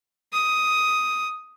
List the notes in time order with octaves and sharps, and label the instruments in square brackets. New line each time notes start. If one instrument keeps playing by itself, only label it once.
[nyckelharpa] D#6